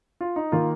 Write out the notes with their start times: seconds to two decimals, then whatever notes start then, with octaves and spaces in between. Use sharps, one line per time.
0.21 F4
0.36 D#4
0.52 D#3 A#3 F4